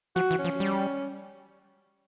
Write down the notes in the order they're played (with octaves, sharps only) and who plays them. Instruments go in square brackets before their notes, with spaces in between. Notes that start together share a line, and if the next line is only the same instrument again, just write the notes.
[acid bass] F3 [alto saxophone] F#4
[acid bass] E3
[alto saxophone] C#4
[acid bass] F3
G3